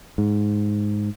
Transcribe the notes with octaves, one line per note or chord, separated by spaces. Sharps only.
G#2